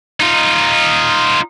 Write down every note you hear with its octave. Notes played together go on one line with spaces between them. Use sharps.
D#4 F4